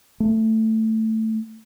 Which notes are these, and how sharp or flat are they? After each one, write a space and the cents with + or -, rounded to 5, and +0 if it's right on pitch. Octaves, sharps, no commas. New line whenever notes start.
A3 +10